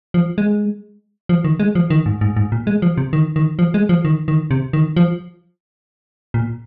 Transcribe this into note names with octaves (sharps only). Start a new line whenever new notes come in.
F3
G#3
F3
D#3
G#3
F3
D#3
G#2
G#2
G#2
A#2
G#3
F3
C3
D#3
D#3
F3
G#3
F3
D#3
D#3
C3
D#3
F3
A#2